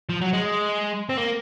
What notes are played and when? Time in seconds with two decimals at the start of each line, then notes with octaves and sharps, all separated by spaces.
0.09 F3
0.21 F#3
0.33 G#3
1.09 C4
1.17 A#3